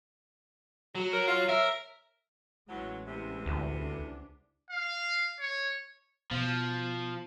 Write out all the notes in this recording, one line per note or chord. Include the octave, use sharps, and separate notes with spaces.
F#3 F#4
A#4 C#5
F4
A#4 E5
A1 E2 F#3 G#3
E2 C3
D2
C#2 D4
F5
C#5
B2 F3